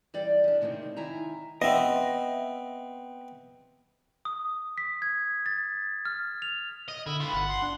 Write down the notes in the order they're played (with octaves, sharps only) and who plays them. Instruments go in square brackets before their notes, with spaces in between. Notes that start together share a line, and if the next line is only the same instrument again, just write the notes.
[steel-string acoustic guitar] E3 G3 D5 G5
C#3 D4
A2 C3 D#3 A#3 C4
D#3 E4 G#5 A#5
[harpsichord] B3 C4 [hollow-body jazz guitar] D#5 E5
[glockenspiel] D#6
B6
G#6
A6
F6
F7
[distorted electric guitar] D#5
[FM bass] D3 [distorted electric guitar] E4
[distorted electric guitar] F4 B4 [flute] B5
[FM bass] G1 [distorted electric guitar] F#5
[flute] C6
[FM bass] D4